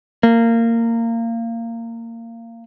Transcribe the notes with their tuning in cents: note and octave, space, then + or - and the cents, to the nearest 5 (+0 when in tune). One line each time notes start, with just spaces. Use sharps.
A#3 -20